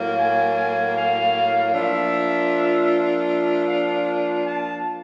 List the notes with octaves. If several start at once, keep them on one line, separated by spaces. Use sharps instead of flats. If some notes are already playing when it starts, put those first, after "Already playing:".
Already playing: A2 F#3 A#3
G#5
G#5
F5
F3 A#3 D4 F4 E5
E5
F5
A5